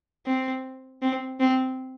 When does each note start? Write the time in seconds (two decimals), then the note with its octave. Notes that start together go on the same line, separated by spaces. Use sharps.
0.26 C4
1.02 C4
1.40 C4